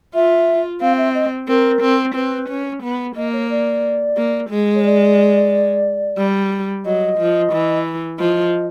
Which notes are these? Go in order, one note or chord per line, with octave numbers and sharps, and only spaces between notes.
F4 E5
C4 F5
E5
D#5
C4 A#4
C4
C4 B4
C#4
B3
A#3 D#5
C#5
D5
A#3
G#3
C#5
D5
G3
F#3 D#5
F3
E3
F3 D#5